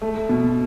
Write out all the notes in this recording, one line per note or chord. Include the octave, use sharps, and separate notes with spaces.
A3
B2